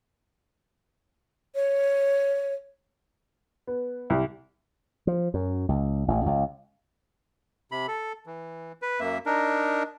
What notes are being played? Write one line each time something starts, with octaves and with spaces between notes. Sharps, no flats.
C#5
B3
C2
F3
F#2
C#2
A1
C#2
C3 B5
A4
E3
B4
F#2 A#3 E5
D4 D#4 A#4